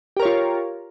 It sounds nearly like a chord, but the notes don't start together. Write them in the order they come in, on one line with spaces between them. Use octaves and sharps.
G4 A#4 C#5 F4